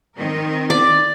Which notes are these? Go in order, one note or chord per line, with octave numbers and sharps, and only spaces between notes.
D#3 C4 A#4
D5